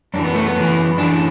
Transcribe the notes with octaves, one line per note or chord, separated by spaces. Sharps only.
F#2 E3 D4
B3
A3
B3
F#2 E3
F#2 E3 D4